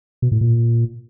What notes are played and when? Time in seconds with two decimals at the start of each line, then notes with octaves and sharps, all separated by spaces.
0.22 B2
0.32 A2
0.41 A#2